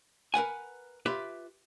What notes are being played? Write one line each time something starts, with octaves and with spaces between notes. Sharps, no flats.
A#4 B4 F#5 G#5
F4 G4 B4 E5